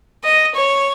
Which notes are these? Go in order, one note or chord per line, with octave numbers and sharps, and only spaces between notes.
D#5
C#5